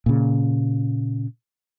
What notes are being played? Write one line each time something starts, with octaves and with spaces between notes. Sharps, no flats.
A#2 C#3